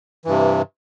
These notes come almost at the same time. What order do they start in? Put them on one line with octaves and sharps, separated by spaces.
E3 G2 C3